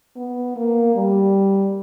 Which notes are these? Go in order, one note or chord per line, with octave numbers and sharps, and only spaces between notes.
B3
A#3
G3